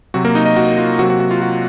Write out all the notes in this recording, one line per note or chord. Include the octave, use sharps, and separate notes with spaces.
C3 F#3 C4 F#4
A#3 A#4
D#4 D#5
D#4 D#5
F#4
F4
C3 F#3 A#3 F#4
F#4
F#4
F4
F#4